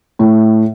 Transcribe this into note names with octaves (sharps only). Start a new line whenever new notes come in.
A2